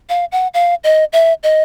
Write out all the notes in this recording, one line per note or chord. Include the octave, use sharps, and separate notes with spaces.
F5
F#5
F5
D#5
E5
D#5